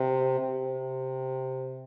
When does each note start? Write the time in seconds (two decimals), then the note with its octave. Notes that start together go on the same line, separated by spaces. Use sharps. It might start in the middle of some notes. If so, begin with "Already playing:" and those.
Already playing: C3
0.40 C3